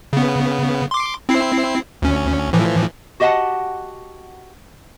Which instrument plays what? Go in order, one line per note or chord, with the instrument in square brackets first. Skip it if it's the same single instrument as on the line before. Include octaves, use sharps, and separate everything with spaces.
[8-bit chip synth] C#3 B3
C6 D6
C4 E4 C7
D2 C#4
A2 E3 F3
[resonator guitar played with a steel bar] F#4 G4 D#5 F5 F#5 A5